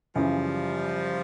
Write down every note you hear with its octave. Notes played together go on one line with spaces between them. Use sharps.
F#2 C#3 E3 F3 G3